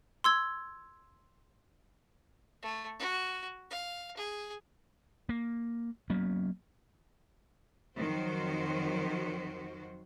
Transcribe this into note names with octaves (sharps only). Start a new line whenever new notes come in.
C6 E6 G#6
A3
F#4
F5
G#4
A#3
F#3 A#3 B3 C#4
F2 D#3 F#3 F#4 C5